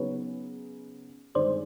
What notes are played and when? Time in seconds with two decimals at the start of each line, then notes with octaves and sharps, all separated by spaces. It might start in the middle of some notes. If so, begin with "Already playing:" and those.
Already playing: C#3 F#3 B3 D#4 G#4 B4 C#5
1.35 G2 D#3 G#3 C5 D5